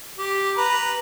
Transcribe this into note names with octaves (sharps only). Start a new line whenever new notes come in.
G4
B4 A#5